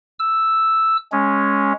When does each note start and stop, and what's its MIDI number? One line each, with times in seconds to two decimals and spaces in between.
0.19 0.97 88
1.12 1.73 56
1.12 1.73 61